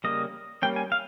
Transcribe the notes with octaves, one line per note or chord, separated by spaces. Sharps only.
C#3 G3 A#3 D#5
G3 A#3 C#4 G5
G#5
F5